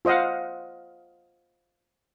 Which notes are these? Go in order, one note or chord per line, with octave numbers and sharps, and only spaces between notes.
F4 C5 D#5 F5 F#5